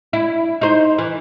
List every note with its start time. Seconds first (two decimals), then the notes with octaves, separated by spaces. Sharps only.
0.13 E4
0.61 D#4 C5
0.98 E3